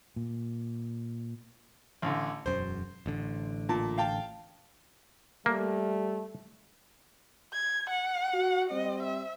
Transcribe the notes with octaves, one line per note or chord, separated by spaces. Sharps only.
A#2
A1 D3
E1 F#2 C5
A1 D3
A#2 A5
F5 G5 A5
G3 A3 A#3
G#6
F#5
F#4
G3 C4 D#5
E5